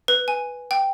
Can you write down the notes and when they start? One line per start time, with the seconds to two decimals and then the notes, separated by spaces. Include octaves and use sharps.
0.08 B4
0.28 G#5
0.71 G5